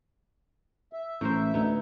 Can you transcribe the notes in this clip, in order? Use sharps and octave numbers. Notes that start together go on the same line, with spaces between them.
E5
A1 A2 A#4 C5
D2 B3 D#4 E4